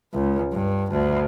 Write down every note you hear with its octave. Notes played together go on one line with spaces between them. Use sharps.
C#2
G2
D2